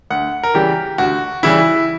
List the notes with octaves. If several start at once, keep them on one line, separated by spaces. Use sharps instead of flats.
D2 F#5
A#4
C#3 E3 G3 G4
D2 F#4
C#3 E3 G3 E4